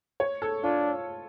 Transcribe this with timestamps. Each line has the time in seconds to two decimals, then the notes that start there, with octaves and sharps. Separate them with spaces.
0.20 C#5
0.42 A4
0.63 D4 F4